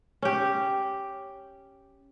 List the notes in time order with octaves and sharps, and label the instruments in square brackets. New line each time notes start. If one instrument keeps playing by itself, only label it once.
[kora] C#4 G4